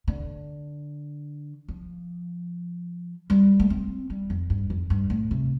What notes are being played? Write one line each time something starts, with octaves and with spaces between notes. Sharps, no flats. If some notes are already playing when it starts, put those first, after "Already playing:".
D3
F3
G3
A3
C4
G3
F2
G2
F2
G2
A2
C3